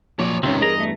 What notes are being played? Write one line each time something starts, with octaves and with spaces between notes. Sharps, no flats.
A#2 F3 F#3 C#5 D5
C#2 G#2 C3 D#3 C4 C#4
E2 G2 G#4 A#4 D#5 A#5
A3